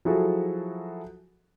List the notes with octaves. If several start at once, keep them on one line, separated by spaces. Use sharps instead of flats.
F3 F#3 E4 F#4 G#4 A4